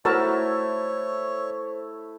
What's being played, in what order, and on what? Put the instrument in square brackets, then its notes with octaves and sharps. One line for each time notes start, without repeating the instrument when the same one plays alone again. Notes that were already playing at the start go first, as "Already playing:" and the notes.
[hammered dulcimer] A3 E4 E5 [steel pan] F#4 A#4 A5 [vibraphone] C5 [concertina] C#5